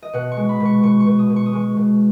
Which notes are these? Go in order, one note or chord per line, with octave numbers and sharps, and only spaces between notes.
D#5
B2 F#5
C#6
G#3
B5
B2
C#6
B2 C#6
C#6
B2
D#6
B2
C#6
D#6
G#3 C#6
B2